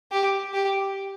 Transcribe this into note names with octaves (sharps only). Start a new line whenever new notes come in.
G4
G4